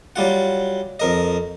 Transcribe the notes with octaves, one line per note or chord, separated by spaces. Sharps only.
F#3 G3 F4 F#5
F2 A#4 D#5